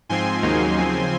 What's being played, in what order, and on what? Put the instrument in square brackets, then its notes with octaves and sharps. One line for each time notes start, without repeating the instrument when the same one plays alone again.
[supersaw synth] G#2 F3 C4 G#5 C6
D#2 C#3 F#3 A#3 D#4
C#3 F3 C4